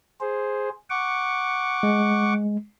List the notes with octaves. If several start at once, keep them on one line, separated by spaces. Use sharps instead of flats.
G#4 C5
F#5 C#6 D6
G#3